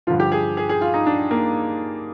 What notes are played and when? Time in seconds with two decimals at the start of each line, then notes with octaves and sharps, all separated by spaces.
0.07 G2 D3 F3 F4
0.20 G4
0.32 G#4
0.57 G#4
0.69 G#4
0.81 F4
0.94 D#4
1.06 D4
1.31 A#3